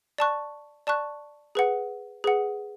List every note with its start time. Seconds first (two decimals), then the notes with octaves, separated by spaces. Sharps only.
0.18 D5 A5 C#6 F#6
0.87 D5 A5 C#6 F#6
1.55 G#4 B4 F#5
2.24 G#4 B4 F#5